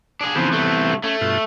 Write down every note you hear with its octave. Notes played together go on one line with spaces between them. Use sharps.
D4 G#4
C#3 E3 F3 B3 C4
C2 A3
A3 C#4
G2 B2 F4